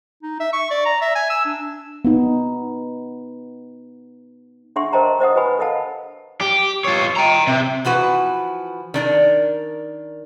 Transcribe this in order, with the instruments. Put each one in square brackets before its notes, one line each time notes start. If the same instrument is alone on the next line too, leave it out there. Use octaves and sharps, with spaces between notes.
[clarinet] D#4
E5
C#6
D5
A#5
E5
G#5
E6
D4
[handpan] B3 D#4
[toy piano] D4 G#4 E5 F#5 C6 C#6
A#4 C5 D#5 G5 A5 A#5
C5 D#5 F#5 D#6
G4 B4 G#5 B5
A4 A#4 D#5 F5 F#5 A5
[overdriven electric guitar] G4
F4 C#5
G5 A#5
C3
[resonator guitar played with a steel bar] E3 F3 F#4 B4
D#3 D4 A#4